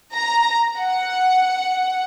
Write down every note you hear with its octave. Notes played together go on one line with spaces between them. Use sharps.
A#5
F#5